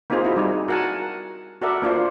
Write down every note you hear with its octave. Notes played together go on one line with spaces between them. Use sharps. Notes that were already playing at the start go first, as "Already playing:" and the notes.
A#3 C4 D#4 F4 G#4 C5
E4 F#4
G3 D#4 G#4
F#4 A#4 F#5 G#5 A5
F#4 A4 A#4 D5 E5 F#5
A#3 D4 F4 C5